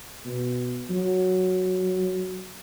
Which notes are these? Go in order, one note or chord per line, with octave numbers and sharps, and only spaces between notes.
B2
F#3